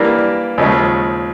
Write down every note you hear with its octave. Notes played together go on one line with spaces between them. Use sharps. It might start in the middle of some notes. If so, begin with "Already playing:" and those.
Already playing: E3 G3 A#3 D4
D#2 C#3 F3 G#3